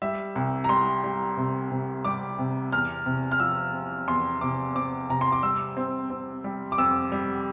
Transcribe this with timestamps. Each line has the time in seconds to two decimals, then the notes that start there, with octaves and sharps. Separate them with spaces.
0.02 G3 E5
0.35 C2
0.64 A#5
0.69 G3 C6
1.04 G3
1.37 C3
1.71 C3
2.05 G3 D6
2.38 C3
2.72 E2 F6
3.06 C3
3.31 F6
3.40 F3 E6
3.74 C4
4.07 E2 C6
4.41 C3 D6
4.75 C4 D6
5.09 C3 A#5
5.21 C6
5.32 D6
5.43 G3 E6
5.77 C4
6.10 C4
6.44 G3
6.72 D6
6.78 F2 E6
7.12 G3